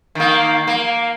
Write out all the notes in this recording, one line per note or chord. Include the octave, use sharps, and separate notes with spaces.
D#3 A#3
A#3